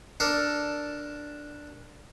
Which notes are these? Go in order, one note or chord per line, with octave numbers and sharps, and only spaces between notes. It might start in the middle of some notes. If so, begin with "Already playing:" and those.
D4 A4 A#4